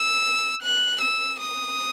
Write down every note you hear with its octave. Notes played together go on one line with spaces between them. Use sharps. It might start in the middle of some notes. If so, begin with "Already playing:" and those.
Already playing: E6
F#6
E6
D#6